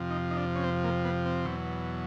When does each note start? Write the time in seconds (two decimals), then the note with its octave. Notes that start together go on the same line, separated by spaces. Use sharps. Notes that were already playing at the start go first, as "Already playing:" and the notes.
Already playing: F2 C3 F3
0.10 D#4
0.31 D#4
0.37 D4
0.56 C#4
0.64 C4
0.84 A#3
1.05 B3
1.25 C4
1.45 E2 B2 F#3